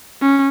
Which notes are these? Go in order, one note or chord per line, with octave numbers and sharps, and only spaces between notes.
C#4